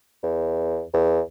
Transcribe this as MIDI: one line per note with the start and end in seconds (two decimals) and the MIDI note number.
0.24 0.84 40
0.94 1.21 40